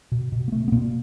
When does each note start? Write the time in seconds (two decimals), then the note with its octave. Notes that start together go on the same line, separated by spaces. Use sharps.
0.12 B2
0.32 B2
0.48 A#3
0.52 B2 A3
0.68 B3
0.72 B2 A#3